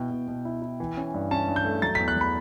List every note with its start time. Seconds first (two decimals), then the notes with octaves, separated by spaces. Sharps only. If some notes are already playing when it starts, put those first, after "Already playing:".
Already playing: B2 E4 G5
0.10 B2
0.28 B2
0.45 E4
0.62 E4
0.80 E3
0.97 C#4
1.14 G2
1.31 C#4 A5
1.48 G2
1.56 G6
1.65 A3
1.82 F#3 A6
1.95 E2 B6
2.08 F#6
2.16 F#3 B5